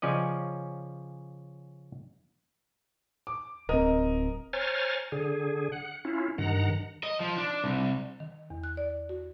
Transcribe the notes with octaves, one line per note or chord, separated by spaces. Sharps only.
C#3 F3 C#4 D5 D#5
D6
D1 C4 A#4 D#5
C5 C#5 G#5 A#5 F6 A6
D3 G#4
F#5
C#4 E4 F4
G2 D#3 F#5 A#5
D#5
F3
D4
C2
D#3
E2
F#6
D5
F#4